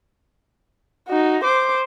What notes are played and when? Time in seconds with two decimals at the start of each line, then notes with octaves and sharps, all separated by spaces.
1.08 D#4 F#4
1.44 C5 D6